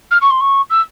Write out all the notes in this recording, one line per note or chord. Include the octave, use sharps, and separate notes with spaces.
F6
C#6
C6
C#6
E6